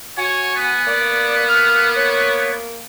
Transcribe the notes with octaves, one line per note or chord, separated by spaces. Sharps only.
F#4 C#5 G#5
B3
A#3 D5
F6
C#5